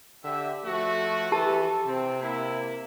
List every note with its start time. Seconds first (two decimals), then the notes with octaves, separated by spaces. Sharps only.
0.24 D3 G4 E5
0.65 F3 A3 F#4
1.32 E3 G4 A4 A5
1.87 C3 C4
2.22 A#3 E4